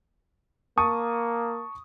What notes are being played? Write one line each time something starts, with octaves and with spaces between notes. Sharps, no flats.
A#3 A5 C#6 D#6